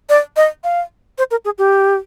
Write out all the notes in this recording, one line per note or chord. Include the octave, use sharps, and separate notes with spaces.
D5
D#5
F5
C5
A#4
G#4
G4